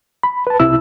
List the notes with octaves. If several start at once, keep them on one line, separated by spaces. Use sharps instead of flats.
B5
B4 A5
C2 C3 E4 E6